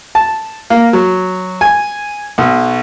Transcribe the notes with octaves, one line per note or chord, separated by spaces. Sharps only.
A5
A#3
F#3
G#5
B1